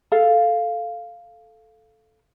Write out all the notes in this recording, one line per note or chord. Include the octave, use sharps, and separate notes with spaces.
A4 F5